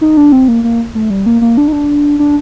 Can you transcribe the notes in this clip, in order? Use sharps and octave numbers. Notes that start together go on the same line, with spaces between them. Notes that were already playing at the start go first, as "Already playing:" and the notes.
D#4
D4
C4
A#3
A#3
A3
G3
A#3
A#3
D4
D#4
D4
D4